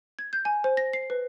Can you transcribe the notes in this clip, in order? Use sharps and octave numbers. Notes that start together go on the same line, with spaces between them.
G#6
G6
G#5
C5
A#6
C7
B4